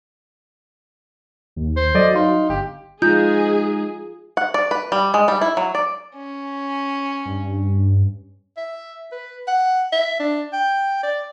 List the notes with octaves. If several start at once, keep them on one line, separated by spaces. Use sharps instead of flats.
D#2
C5
F#3 A4 D5 D#5
D#4 F5 C6
G1 G4
G#3 D#4 F4 G#4 G6
F#5
D5
B4
G3
G#3
G3
E4
F#3
D5
C#4
G2
E5
B4
F#5
E5
D4
G5
D5